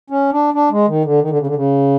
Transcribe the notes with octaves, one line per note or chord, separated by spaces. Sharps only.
C#4
D4
D4
G#3
D#3
D3
D#3
D3
C#3
D3
C#3